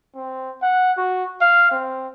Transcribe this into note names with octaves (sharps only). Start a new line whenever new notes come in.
C4
F#5
F#4
F5
C4